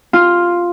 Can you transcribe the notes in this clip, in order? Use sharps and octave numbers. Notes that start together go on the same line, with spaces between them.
F4